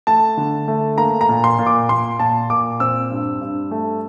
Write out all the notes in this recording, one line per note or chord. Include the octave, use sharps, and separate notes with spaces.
A3 A5
D3
A3
A#3 A#5
A#5
A#2
C6
A#2
D6
A#2 C6
A#2 A5
A#2 D6
C4 E6
G2
G2
A3